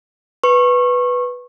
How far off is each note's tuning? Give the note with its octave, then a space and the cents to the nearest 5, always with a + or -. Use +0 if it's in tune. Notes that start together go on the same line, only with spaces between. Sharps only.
B4 +0 C#6 -25